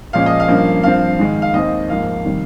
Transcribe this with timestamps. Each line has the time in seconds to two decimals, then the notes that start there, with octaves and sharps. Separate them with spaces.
0.13 A#2 F3 G#3 C#4 F5
0.26 D#5
0.40 F5
0.48 G2 F3 A#3 C#4
0.83 G2 F3 C4 F5
1.19 G#2 D#3 G#3
1.42 F5
1.54 D#2 D#3 G#3 C4 D#5
1.89 G#2 F3 A#3 F5
2.25 C3 D#3 G3